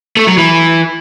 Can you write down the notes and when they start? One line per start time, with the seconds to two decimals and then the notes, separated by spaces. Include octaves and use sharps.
0.17 A3
0.27 F#3
0.37 E3